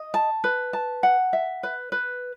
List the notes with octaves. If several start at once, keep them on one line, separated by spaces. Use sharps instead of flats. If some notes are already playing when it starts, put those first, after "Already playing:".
Already playing: D#5
A5
B4
A5
F#5
E5
B4
B4